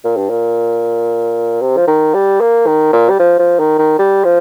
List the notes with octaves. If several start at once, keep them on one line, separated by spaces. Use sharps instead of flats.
A#2
G2
A#2
C3
F3
D#3
G3
A#3
D#3
A#2
G3
F3
F3
D#3
D#3
G3
F3